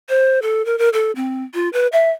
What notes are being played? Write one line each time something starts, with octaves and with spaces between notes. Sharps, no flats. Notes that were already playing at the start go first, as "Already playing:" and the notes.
C5
A4
A#4
A#4
A4
C4
F4
B4
E5